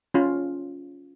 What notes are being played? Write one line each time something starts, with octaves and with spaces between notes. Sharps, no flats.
C#4 F4